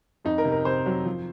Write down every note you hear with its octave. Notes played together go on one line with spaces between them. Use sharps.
F2 D#4
A#4
C3
A#4
C3 C5
F#3
F3